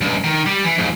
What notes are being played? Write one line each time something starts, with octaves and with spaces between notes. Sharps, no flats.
C#2 G2
D#3
G3
E3
F2 G#2